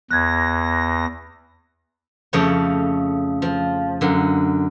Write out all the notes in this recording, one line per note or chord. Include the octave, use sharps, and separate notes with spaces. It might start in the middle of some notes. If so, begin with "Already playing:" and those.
E2 F#6 G#6 A#6
F2 C#3 A3 C#5 G5
F3
F#2 D3